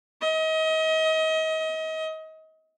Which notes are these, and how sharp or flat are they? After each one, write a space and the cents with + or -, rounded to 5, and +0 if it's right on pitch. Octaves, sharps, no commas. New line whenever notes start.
D#5 +35